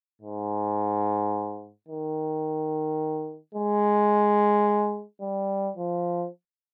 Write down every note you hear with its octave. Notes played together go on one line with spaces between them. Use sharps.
G#2
D#3
G#3
G3
F3